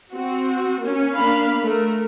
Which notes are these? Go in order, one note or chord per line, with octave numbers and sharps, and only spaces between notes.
C4 F#4
A#3 C#4
A#3 D4 F5 B5
A3 A#4